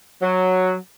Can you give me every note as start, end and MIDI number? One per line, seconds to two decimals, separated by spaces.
0.22 0.74 54